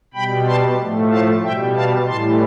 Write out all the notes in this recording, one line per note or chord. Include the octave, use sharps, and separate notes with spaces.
B2 G3 G5 B5
A5 C6
A2 F3 A3
F5 A5
B2 G3 E5 G5
F5 A5
A2 E3 G3 A5 C6